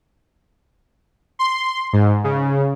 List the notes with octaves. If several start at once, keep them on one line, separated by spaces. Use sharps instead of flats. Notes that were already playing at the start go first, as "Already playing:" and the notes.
C6
G#2
C#3